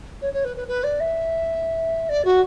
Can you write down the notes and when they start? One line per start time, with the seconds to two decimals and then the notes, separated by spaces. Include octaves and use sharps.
0.21 C#5
0.33 C#5
0.44 B4
0.56 B4
0.68 B4
0.83 D5
1.00 E5
2.09 D5
2.24 F#4